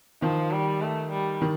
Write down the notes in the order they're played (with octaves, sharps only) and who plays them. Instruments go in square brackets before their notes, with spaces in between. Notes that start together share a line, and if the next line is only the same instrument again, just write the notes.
[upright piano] D#3 [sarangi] F3
[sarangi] G3
A3
G3
[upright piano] D#3